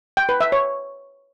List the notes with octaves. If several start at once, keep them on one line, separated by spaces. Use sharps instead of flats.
G5
B4
E5
C#5